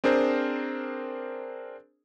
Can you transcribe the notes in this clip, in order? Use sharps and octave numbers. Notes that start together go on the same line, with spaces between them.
C4 D4 G#4 A#4 C5